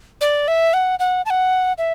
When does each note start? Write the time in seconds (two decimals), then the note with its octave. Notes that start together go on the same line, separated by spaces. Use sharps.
0.21 D5
0.48 E5
0.73 F#5
0.99 F#5
1.26 A5
1.30 F#5
1.78 E5